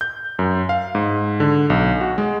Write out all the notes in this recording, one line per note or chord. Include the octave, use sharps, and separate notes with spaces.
G6
F#2
F5
G#2
D3
B1
F#4
G#3